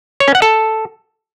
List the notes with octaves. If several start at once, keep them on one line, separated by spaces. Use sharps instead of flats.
C#5
C#4
F#5
A4